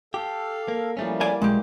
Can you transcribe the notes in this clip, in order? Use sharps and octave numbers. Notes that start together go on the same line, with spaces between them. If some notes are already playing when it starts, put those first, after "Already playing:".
G4 A4 F5
A#3
E3 F3 G3 A3 A#3 C#4
D5 G#5
B1 G#3 G4